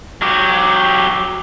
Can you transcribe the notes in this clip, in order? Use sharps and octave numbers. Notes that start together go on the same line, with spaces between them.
F#3 G4